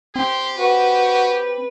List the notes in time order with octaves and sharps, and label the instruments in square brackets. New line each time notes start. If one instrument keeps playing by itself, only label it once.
[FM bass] C4 [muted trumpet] G4 [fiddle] C6
[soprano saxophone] F#4 [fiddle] B4